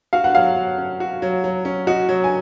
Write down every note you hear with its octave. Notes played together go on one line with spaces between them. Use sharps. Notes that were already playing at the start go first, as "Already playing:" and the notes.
F#4 F5
F#5
F#3 F5
F#3
C#4
F#4
F#3
F#3
C#4
F#4 D#5
F#3
G#5